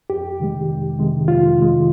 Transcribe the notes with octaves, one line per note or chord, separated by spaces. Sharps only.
F2 G4
C3 D#3 G#3
F2
C3 D#3 G#3
F2 F4
C3 D#3 G#3